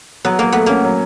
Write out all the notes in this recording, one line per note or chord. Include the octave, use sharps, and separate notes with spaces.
F#3 B3
F#3 A#3
A3 B3
A#3 C#4
F#3